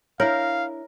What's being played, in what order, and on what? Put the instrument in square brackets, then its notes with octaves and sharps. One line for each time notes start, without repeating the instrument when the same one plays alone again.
[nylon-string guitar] D4 E4 [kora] A#4 [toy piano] C#5 [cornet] F5